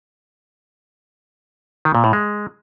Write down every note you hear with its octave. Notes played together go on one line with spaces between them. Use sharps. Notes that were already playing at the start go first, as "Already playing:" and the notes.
D#3
A#2
A2
G#3